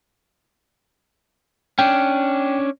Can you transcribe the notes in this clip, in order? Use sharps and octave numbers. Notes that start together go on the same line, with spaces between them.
C#4 D4 G5